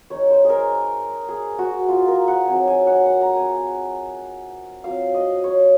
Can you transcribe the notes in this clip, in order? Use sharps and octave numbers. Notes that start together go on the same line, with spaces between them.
G#3 D#4 C#5
C5
G#4 A#4
G#4
F#4
F4
A#4
F#5
F#3 C4 D#4 G#5
G#5
F#5
F#5
A#5
G#5
F#3 C4 F4 F5
D#5
C#5